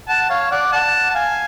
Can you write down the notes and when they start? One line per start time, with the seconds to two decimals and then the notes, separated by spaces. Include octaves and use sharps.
0.09 F#5 A5
0.30 C#5 F5
0.51 D5 F#5
0.72 F#5 A5
1.10 A5
1.15 F5 G#5